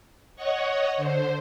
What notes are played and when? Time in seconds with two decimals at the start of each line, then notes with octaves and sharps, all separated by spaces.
0.36 C#5 D#5 F#5 C#6
0.97 D3 C5